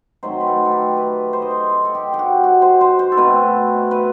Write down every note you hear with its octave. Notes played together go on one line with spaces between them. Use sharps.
D#3 F#3 A3 C4 C5
B4
A4
A4
G4
B4
C5
D#5
C5
D#5
A4
G4
G4
F#4
F#4
C5
C5
C5
A4
B2 A3 C4 B4
B4